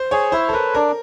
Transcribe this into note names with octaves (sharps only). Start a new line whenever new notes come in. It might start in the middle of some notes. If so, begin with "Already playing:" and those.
Already playing: C5
G#4 C#5
E4 C5
A4
A#4 B4
D4 A#4